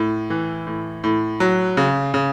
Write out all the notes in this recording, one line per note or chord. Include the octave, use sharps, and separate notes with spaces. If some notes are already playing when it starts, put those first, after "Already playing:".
Already playing: A2
E3
A2
A2
F#3
C#3
C#3